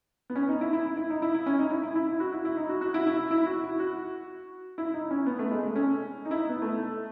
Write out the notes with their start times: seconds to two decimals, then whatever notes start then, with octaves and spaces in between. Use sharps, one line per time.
0.30 B3
0.35 C#4
0.48 D#4
0.61 E4
0.73 E4
0.97 E4
1.10 D#4
1.22 E4
1.34 E4
1.46 C#4
1.59 D#4
1.71 E4
1.83 E4
1.96 E4
2.08 E4
2.20 F#4
2.32 E4
2.45 E4
2.57 D#4
2.69 F#4
2.81 F#4
2.94 E4
3.07 E4
3.18 E4
3.31 E4
3.46 F#4
3.64 E4
3.80 F#4
4.78 E4
4.94 D#4
5.11 C#4
5.26 B3
5.39 A3
5.51 G#3
5.63 A3
5.76 C#4
6.25 D#4
6.31 E4
6.37 D#4
6.49 B3
6.62 A3